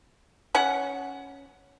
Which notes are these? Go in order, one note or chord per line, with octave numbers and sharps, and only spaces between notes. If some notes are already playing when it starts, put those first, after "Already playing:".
C#4 F#5